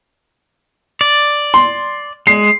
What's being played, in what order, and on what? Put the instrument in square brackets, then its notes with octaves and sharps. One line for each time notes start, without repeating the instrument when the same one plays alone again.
[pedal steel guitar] D5
[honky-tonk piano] C6
[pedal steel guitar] G#3 [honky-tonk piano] C7